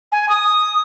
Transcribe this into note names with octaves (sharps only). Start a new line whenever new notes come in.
G#5
D#6